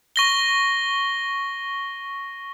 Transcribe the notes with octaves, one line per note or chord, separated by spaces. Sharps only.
C#6 A#6 G7